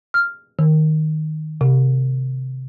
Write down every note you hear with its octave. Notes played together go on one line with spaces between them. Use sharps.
F6
D#3
C3